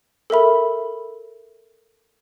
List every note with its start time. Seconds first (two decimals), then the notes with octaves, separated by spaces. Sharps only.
0.30 A4 A#4 E5 B5